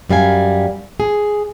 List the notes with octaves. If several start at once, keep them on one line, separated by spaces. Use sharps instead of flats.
F#2 G3 F5 G#5
G#4